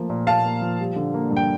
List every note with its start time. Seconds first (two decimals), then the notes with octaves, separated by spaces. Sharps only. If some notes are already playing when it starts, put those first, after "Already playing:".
Already playing: F3 A3 A#3
0.10 A#2
0.27 A#2 F5 A5
0.45 A#3
0.62 F3
0.80 G3
0.96 D3
1.14 A#3
1.31 G2
1.37 G5